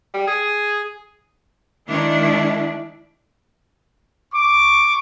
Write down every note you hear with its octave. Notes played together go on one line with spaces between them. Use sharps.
G3
G#4
D#3 G#3 D4 E4
C#6 D6